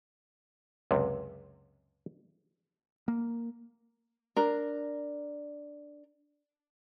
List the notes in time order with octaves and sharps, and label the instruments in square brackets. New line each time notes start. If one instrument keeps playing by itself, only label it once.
[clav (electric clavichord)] C#2 F#2 C3
[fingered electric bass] A#3
[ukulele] D4 A#4